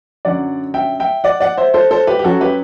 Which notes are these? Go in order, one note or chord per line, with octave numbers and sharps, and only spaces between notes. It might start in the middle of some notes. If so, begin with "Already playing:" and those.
F#2 D3 F#3 D5 F#5
E5 G5
E5 G5
D5 F#5
D5 F#5
C5 E5
A4 C5
A4 C5
G4 B4
G4
F#2 F#3 F#4 A4
G4 B4